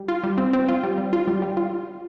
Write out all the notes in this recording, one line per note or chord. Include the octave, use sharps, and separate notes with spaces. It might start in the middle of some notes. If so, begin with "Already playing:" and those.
Already playing: G3
F4
G3
C4
C4
F4
G3
G3
F4
G3
G3
F4